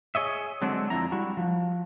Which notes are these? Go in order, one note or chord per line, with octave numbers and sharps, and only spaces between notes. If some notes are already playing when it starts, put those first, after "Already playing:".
G#4 C#5 D#5 E5
D3 F#3 G#3 C4 D4
F2 D3 F3 E4 A#5
G3 E4 F#4
F3